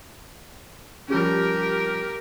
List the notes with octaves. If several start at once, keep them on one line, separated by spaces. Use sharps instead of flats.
F3 G3 C#4 G4 A#4